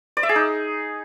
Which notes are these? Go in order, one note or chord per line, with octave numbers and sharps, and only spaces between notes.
D5
E5
G#4
D#4